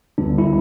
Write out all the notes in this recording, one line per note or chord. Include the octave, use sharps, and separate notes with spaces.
D2 D3 G3 B3 D4
E4